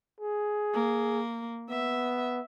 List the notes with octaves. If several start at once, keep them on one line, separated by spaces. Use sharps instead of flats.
G#4
A#3
B3 E5